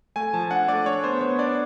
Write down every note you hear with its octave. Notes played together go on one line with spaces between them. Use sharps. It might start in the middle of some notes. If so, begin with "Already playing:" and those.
A3 G#5
F3 A5
D4 F#5
A3 D5
D4 C#5
B3 C5
B3 C#5
D4 D5